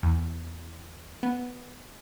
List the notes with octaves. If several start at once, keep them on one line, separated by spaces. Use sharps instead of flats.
E2
B3